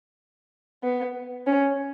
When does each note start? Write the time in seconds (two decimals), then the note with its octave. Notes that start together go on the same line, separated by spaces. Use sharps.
0.83 B3
1.47 C#4